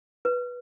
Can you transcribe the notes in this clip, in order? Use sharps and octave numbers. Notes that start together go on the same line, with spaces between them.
B4